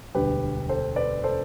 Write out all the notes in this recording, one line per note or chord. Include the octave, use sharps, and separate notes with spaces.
E1 D2 D3 G3 G4 B4
A4 C5
B4 D5
A4 C5